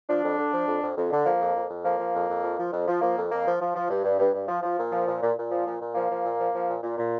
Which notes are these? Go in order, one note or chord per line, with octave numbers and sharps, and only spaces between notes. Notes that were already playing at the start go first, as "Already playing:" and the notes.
F3 D4
F2
D3
F3
F2
F2
F2
D3
F3 A#3
F2
F2
F2
F3 A#3
F3
F2
F2
F3
F3
F2
F3
F3 A#3
F2
F2 A#3
F3
F3
F3
G2
G2
G2
G2
F3
F3
A#2
F3
A#2
A#2
A#2
F3
A#2
A#2
F3 A#3
F3
A#2
F3
F3
A#2
A#2
A#2